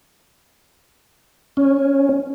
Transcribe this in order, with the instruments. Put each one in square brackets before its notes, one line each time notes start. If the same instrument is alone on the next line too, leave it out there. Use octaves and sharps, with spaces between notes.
[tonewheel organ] C#4